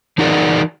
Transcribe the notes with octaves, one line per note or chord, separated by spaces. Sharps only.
E3 D#4 F#4 G#4 A#4 D5